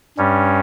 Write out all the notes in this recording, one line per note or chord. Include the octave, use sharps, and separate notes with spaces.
G2 G3 C#4